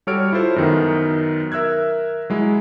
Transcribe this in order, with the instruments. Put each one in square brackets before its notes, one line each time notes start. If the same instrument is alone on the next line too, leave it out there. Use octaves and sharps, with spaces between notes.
[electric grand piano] G3 F#4 A4 C#5 F6 D7
E4 F4 A4 C5
F#2 D#3 B3
A#4 E5 E6 F#6 G#6
F#3 G#3 E4